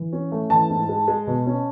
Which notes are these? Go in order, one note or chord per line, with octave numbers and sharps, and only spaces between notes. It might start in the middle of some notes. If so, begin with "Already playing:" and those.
Already playing: E3
C#4
A3
E3 A5
G#2
G#3
G#3
B2
C#4